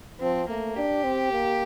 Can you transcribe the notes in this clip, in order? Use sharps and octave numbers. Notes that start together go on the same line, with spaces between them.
F3 C4
A3 A#3
D4 G4
C4
A#3